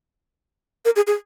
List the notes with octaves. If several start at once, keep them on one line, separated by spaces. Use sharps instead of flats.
A#4
G#4
G#4